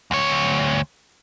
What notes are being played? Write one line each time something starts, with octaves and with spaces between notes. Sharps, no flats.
D2 C#5